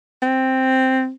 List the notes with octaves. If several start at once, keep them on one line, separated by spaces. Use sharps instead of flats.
C4